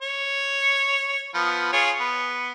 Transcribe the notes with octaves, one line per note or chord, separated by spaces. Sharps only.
C#5
F3 B3
F4 G#4 C#5
B3